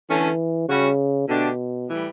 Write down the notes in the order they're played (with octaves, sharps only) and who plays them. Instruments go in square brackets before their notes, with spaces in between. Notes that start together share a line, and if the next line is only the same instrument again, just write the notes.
[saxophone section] D3 A3 C#4 [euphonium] E3
[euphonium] C#3 [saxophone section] G3 C#4 F#4
[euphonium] B2 [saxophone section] D3 A3 D4 G4
[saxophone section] A2 E3 G3